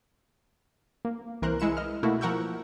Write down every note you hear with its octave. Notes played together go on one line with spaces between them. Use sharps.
A#3
C2 E3 A#4 C5 F#6
G#3 E4 C#7 E7
D#5 F6
B2 A3 A#3 E4 F#4
F3 A#4 F#5 C#6 E6 G6